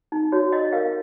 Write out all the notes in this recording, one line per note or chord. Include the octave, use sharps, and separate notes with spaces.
D#4
F#4 C#5
C#5 D#5
A#4 F5